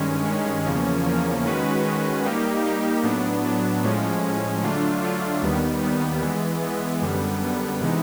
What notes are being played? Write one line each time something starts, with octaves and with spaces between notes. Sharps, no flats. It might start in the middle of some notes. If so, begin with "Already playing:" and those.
Already playing: G2 D#3 G#3 C#4
G2 D#3 G#3 C#4
E2 C#3 F3 A#3 C#4
E2 C#3 F3 A#3 C#4
D#3 G#3 C#4 F#4 B4
D#3 G#3 C#4 F#4 B4
G3 A#3 D#4 G4
G3 A#3 D#4 G4
A2 F#3 B3 D4
A2 F#3 B3 D4
A2 F3 G#3 C#4
A2 F3 G#3 C#4
D3 F#3 A3 D4 F4
D3 F#3 A3 D4 F4
D#2 D#3 G3 B3
D#2 D#3 G3 B3
E3 G#3 B3
E3 G#3 B3
F#2 D3 G3 B3
F#2 D3 G3 B3
C3 E3 G#3 B3 D#4